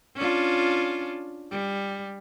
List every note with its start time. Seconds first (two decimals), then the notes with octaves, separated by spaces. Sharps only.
0.16 C#4 D4 F4
1.51 G3